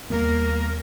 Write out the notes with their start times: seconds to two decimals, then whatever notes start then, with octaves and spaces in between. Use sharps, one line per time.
0.10 D#2 G3 A#3 B3 A#4